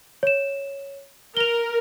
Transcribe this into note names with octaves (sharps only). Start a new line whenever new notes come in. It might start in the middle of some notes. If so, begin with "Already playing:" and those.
C#5 E7
A#4 F7 G7